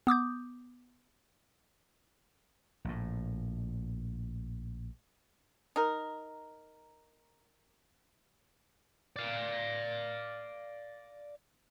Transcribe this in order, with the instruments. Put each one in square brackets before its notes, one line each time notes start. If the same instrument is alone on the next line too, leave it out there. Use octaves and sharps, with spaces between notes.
[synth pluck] B3 D6 D#6 G6
[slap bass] A#1 A2
[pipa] D#4 A#4
[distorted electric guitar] D5 F5